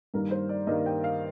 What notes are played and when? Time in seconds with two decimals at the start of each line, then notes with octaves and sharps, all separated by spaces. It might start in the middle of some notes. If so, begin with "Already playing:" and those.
0.14 G2 D#3 G3 A#3 D#4 A#4
0.31 C5
0.49 D5
0.67 G2 D#3 G3 A#3 D#4 D#5
0.86 G5
1.04 F5